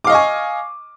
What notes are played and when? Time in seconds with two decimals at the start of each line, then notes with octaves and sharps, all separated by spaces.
0.04 D6
0.07 F5
0.10 D#5
0.12 C#6
0.15 G#5